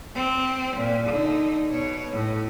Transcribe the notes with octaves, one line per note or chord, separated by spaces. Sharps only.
C4
A#2
D3 D#4
B2 C#5
A2